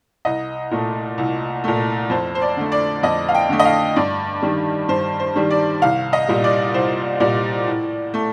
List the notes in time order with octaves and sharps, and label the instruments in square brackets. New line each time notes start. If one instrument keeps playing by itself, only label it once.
[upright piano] C2 D#5
A#2 A3
C2
A#2 A3
F2 C5
C5
D5
D3 A3
D5
F2 D#5
F5
G5
D3 A3
D#5
F5
G2 D5
D#3 G3
G2 C5
C5
D#3 G3
D5
C2 F5
D#5
A#2 G3
D5
C2 C5
A#2 G3 D5
A2
A3